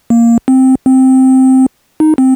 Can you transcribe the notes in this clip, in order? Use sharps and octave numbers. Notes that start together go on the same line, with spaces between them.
A#3
C4
C4
D#4
C4